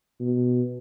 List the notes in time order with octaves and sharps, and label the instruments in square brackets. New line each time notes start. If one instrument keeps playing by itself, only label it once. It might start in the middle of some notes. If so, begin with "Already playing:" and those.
[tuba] B2